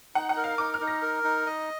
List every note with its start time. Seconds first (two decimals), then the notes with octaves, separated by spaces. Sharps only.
0.15 D#4 F#5
0.29 F#5
0.37 A#4
0.44 F5
0.58 D#4 D6
0.74 F6
0.81 D#4
0.87 A#6
1.02 A#4
1.24 D#4
1.47 D#5